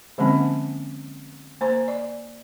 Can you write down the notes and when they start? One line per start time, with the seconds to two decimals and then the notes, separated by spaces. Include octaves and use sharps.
0.18 D3 F3 G#3 A#3 C4 C#4
1.61 A#3 C5 A#5
1.88 D5